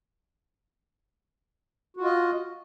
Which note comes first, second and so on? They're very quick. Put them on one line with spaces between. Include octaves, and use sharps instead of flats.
F#4 F4 D#5